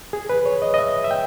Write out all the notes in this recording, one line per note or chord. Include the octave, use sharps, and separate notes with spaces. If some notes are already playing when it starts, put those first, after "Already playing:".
G#4
B4
C#5
D#5
D#5
E5
E5
G5